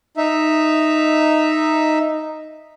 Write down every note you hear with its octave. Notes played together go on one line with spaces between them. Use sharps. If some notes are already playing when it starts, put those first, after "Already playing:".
D#4 E5